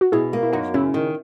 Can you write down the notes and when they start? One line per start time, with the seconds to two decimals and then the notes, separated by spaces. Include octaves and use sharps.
0.01 F#4
0.12 B2 E4 G#4
0.33 A#3
0.43 E4
0.53 F#2 D#4 F#4
0.74 C#3 C#4 E4
0.94 D#3